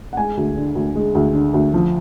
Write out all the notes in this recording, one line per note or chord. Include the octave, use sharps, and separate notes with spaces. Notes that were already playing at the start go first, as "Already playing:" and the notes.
F#5
G#3 G#5
D2
D3
D2
G#3
D2
D3
D2
F3